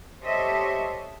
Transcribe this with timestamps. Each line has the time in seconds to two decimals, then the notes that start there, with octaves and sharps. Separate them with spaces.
0.23 G4 A4 C5 C#5 D#5 E5